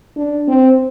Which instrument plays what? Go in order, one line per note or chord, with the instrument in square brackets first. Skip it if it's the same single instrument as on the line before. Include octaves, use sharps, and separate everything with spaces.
[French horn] D4
C4